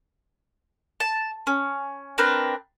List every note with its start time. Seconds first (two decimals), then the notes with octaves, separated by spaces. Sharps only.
1.00 A5
1.47 C#4
2.18 C4 D4 A#4 B4